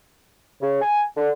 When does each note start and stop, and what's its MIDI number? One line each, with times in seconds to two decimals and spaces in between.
0.62 0.80 49
0.82 1.04 80
1.17 1.31 50